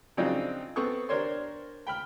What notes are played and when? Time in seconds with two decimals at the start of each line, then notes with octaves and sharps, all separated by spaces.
0.17 C#3 F3 F#3 C4 D4 D#4
0.76 B3 C4 A4 C#6 D#6
1.09 D4 G4 A#4 C5 C#5 C6
1.87 G5 B5 F6